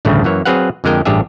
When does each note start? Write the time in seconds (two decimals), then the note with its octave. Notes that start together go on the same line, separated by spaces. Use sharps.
0.05 A1 D2 G2 C#3 A3
0.24 F#2 E3 A#3 C#5
0.45 F#3 C4 G#4 B4 F5 F#5
0.84 F2 D3 G#3 A#4 G5
1.05 A1 G2 D4 G4 G#4 E5